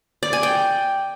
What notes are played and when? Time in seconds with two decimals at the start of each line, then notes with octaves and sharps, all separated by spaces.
0.23 D5
0.33 G#5
0.43 G5